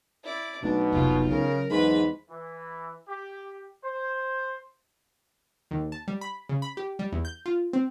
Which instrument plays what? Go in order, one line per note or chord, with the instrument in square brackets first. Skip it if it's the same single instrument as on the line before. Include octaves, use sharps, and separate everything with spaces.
[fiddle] E4 D5
[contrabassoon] B1 [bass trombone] B2 [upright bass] A3 [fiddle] D4
[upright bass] F1 C2 [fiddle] F4 G4
[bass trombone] C#3 [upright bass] F#3 [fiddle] A#4
[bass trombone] E2 [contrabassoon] G#2 [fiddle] B4 B5
[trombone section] E3
G4
C5
[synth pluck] D#2
A5
G3
B5
C#3
B5
G4
G3
E2
G6
F4
C4